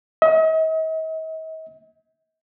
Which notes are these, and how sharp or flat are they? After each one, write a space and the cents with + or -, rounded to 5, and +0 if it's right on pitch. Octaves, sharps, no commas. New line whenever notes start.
D#5 +45